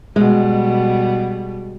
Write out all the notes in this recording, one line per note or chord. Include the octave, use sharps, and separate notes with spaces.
B2 G3 G#3